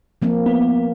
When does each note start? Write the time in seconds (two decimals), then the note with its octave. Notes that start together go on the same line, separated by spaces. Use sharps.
0.22 F3 A#3 C4
0.46 B3